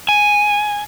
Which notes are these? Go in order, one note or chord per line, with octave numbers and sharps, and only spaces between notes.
G#5